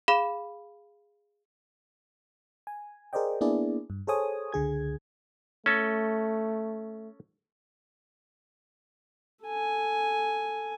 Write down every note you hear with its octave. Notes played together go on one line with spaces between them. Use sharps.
G#4 F5 B5 E7 G7
G#5
G#4 A#4 C5 D5 D#5 G5
A#3 B3 D4 E4 G#4 D5
G2
G#4 A4 C5 C#5 G#5 D#6
C#2 D3 G#4 G#6
A3 C#4 A4
A4 G#5